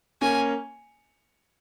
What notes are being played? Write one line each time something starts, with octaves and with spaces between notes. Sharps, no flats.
A#3 C#4 G#5